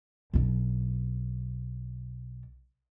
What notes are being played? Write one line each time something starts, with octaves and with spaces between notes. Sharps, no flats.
B1 D4